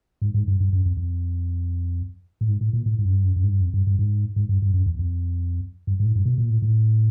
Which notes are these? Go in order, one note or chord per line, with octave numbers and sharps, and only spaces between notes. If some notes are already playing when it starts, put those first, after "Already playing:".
G#2
G#2
G2
G2
F#2
F2
F2
A2
G#2
A2
A#2
A2
G#2
F#2
G2
F#2
F#2
G#2
G2
F2
G2
G2
G#2
G#2
G2
G2
F#2
E2
F2
G2
G#2
A2
G2
B2
A#2
A2
A2